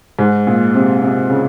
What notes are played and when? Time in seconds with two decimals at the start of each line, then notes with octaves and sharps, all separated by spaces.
0.19 G#2
0.47 A#2
0.74 C3
1.02 C3
1.30 C#3